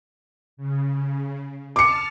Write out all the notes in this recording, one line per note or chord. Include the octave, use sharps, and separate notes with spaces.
C#3
A5 D6 F6 C#7